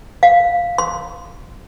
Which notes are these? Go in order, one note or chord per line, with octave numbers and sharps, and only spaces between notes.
F5
C6